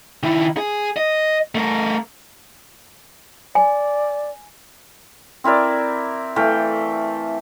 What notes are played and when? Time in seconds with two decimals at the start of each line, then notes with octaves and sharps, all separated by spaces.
0.23 D#3 E4
0.57 G#4
0.97 D#5
1.55 A3 A#4
3.55 D5 G#5
5.44 C4 E4 A#4 D5
6.36 E3 A3 F5 G5